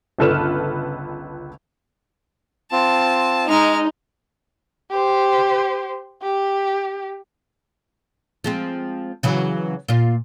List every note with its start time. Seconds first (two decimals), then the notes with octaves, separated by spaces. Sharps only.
0.18 G1 C#2 A4 B4 F6 E7
2.72 C4 F4 A5
3.48 G#3 D#4 F6
4.91 G4 C5
6.22 G4
8.44 F3 G#3 C4
9.23 C#3 E3 F#3
9.89 A#2 F4